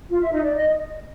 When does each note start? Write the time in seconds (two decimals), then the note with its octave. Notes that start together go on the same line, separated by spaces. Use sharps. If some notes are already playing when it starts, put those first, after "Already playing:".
0.10 F4
0.21 E5
0.32 D#4
0.43 D5
0.54 D#5